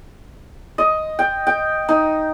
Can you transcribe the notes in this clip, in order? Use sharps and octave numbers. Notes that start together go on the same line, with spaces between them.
D#5
G5
G5
D#4